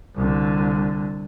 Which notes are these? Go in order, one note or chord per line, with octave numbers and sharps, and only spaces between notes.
C2 D3